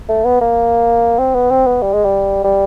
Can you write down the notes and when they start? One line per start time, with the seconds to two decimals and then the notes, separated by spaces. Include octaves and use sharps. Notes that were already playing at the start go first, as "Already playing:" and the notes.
0.09 A3
0.25 B3
0.41 A#3
1.19 C4
1.35 B3
1.51 C4
1.67 B3
1.82 G3
1.93 G#3
2.05 G3
2.44 G3